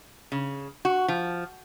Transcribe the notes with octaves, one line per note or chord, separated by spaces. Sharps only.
C#3
F#4
F3